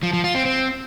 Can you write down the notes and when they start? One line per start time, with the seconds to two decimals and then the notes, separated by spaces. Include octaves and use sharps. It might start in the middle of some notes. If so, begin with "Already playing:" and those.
0.03 F3
0.13 F3
0.24 F4
0.35 C4
0.45 C4